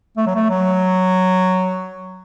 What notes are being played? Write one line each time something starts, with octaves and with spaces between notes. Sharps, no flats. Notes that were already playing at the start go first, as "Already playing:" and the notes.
A3
F#3
A3
F#3